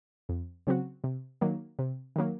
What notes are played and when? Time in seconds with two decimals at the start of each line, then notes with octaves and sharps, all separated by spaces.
0.29 F2
0.67 C#3 F#3 C4 F#4
1.04 C3
1.41 D#3 F#3 A#3
1.79 C3
2.16 D#3 F#3 A#3